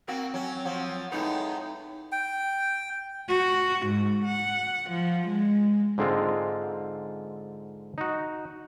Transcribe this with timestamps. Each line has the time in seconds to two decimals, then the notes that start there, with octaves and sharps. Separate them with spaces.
0.08 A#3 C4 F#4
0.34 F#3 C#4
0.65 F3 F#3
1.12 A2 G#3 B3 D#4
2.12 G5
3.29 F#4
3.87 G#2
4.25 F#5
4.91 F3
5.28 G#3
5.98 G#2 D3 G#3 C4 F4
7.98 D#4 F#4